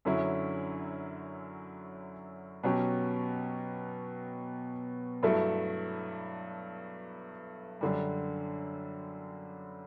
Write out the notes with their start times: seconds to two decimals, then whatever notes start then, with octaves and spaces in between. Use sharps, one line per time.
0.05 F#2 D3 F#3 C#4 E4
2.63 B2 F#3 C#4 G4
5.23 G2 F#3 A3 E4 A4
7.81 F#2 D3 G3